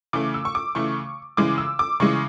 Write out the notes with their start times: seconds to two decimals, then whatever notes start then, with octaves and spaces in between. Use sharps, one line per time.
0.13 C#3 E3 A3 D6
0.34 E6
0.45 C#6
0.55 D6
0.75 C#3 E3 A3 C#6
1.37 C#3 E3 G#3 D6
1.58 E6
1.79 D6
2.00 C#3 E3 G#3 C#6